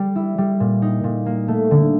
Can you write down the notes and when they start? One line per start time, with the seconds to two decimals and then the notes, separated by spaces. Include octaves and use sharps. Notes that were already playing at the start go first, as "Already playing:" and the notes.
Already playing: G3
0.15 E4
0.38 G3
0.60 A#2
0.82 D#4
1.04 A#2
1.26 A#3
1.48 A3
1.71 D3